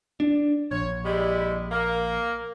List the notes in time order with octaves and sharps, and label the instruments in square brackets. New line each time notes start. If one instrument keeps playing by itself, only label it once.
[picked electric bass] D4
[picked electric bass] A#1 [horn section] C#5
[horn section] G3 G#3 E4
A#3